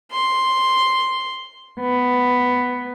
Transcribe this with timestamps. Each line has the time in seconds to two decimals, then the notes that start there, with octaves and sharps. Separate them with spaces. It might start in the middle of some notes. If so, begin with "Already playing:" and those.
0.12 C6
1.80 B3